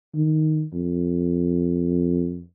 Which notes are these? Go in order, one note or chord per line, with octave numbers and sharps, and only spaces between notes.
D#3
F2